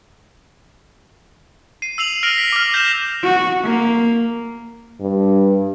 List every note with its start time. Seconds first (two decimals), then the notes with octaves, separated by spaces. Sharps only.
1.82 C7 D#7
1.98 E6 C7 F7 F#7
2.23 F6 A#6 D7 D#7 F7 F#7
2.38 B6
2.52 D6 F6
2.74 G6 A#6 E7 F7
3.24 F#4
3.65 A#3
5.01 G2